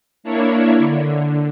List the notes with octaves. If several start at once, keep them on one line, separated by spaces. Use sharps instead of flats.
A#3 D4 E4 C#5
D3